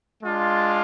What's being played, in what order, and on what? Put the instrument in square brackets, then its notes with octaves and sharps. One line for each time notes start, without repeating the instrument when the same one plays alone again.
[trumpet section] G#3 D4 F4